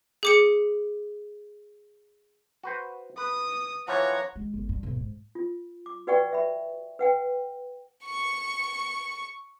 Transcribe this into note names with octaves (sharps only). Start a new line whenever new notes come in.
G#4 D6 C#7
F#4 B4 C5
B4 D#6
E3 F3 C#5 F#5 A#5
G#3
G1
G2
B1
G#2
F4
D6
F#4 B4 D5 F#5 G5 C#6
E5 B5
B4 F#5 G5
C#6 C#7